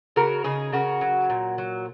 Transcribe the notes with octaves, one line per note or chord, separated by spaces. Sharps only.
C#3 F#4 A#4
C#3 D#4 G#4
C#3 F#4 A#4
F#3
A#2
F#3